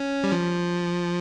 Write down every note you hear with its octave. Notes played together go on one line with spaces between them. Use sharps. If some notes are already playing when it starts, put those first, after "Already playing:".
Already playing: C#4
G3
F3